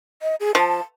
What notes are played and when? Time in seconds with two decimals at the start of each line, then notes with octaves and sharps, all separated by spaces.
0.22 D#5
0.40 G#4
0.55 F3 A5